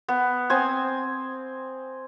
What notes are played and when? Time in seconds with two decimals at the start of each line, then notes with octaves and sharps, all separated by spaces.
0.08 B3
0.50 C4 G#5 D#6